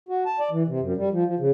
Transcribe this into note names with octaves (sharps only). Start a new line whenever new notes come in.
F#4
A5
D5
E3
C3
F#2
G3
F3
F3
C#3